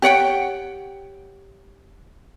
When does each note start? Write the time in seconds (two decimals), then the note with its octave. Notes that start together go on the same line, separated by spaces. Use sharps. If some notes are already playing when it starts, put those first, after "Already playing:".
0.02 G4 C#5 F#5 G5